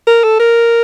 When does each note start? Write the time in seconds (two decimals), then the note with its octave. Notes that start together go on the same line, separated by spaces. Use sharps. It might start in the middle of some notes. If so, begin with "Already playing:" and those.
0.07 A#4
0.24 A4
0.39 A#4